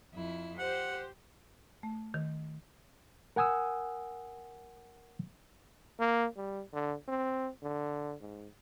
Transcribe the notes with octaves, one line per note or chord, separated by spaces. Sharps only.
F2 E4
G4 C5 F#5
A3
D#3
A#4 F#5 G#5 D#6 E6
A#3
G3
D3
C4
D3
G#2